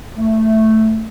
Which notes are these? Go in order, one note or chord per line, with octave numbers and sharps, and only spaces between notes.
A3